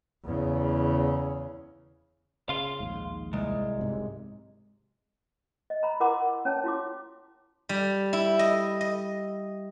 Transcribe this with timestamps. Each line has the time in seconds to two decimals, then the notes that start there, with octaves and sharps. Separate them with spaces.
0.24 E2 C#3
2.49 C#3 F5 C6
2.80 A#1 D#2 G#2
3.33 C2 G#3
3.79 G#2 C3 F#3
5.70 D#5
5.83 A#5 B5
6.00 E4 A#4 F#5 A#5 C6 D6
6.45 C#4 C#5 A5
6.64 E4 F#4 D6
7.69 G3
8.13 E4
8.39 D#5
8.81 D#5